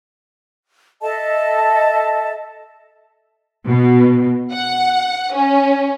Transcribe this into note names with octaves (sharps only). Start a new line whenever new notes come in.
A4 D#5 E5 A5
B2
F#5
C#4